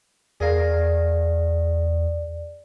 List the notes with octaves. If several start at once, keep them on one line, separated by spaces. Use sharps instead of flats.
E2 G#4 A#4 D5 F5